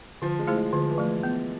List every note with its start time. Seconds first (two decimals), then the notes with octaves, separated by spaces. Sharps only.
0.22 D3 F3
0.39 G#3
0.47 A3 E4 G#4 C5
0.56 G#3
0.73 D3 F3
0.90 E3
0.98 F3 A3
1.07 E3
1.23 B3